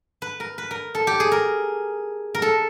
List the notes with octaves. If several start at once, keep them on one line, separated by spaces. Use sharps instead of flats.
B4
A#4
B4
A#4
A4
G4
G#4
A#4
A#4
A4